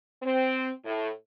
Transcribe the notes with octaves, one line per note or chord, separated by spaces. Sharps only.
C4
A2